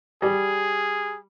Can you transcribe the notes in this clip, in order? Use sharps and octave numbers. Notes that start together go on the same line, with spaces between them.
G3 G#4